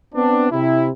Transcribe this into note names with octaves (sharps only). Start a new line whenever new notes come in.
B3 C4 D4
C3 E4